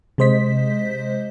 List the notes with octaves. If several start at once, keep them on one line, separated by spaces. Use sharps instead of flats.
C3 G#3 C5 D#5 B6